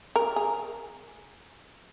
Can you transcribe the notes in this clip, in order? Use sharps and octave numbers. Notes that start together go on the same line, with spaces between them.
A#4
G#4